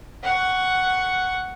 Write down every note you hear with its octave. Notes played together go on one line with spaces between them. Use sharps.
F#5 C#6